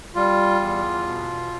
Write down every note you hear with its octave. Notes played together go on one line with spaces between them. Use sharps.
G3 F4
E2
B2